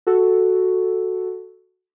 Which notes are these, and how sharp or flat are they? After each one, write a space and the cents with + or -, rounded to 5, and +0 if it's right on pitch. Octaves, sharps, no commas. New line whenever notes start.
F#4 +0 A4 +0